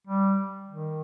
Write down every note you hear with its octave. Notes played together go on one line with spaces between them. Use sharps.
G3
D#3